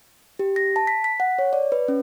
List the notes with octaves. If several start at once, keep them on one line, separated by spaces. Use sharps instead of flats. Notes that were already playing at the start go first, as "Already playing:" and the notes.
G4
A#6
A5
B6
B6
F#5
C#5
D5
B4
C#4